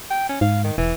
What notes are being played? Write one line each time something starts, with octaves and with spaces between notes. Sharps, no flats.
G5
C#4
G#2 F5
D#3
E1 E3